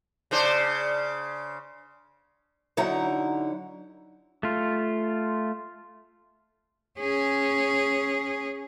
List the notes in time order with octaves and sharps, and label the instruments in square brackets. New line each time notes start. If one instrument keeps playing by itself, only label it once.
[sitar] C#3 D4 C5
[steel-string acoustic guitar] D3 F#3 D#4 E4 F#5 A#5
[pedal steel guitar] A3 F4
[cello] C#4 G#4